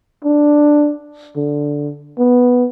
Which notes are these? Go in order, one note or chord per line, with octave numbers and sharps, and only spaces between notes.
D4
D3
B3